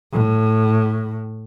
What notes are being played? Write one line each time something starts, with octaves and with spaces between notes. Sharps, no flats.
A2